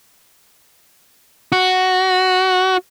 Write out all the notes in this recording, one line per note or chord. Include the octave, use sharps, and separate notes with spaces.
F#4